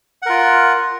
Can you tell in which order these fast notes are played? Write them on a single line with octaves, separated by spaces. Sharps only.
F#5 A#4 F4